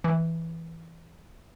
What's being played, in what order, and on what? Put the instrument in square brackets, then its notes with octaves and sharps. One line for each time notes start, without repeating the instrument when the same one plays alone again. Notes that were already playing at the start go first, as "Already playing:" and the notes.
[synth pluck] E3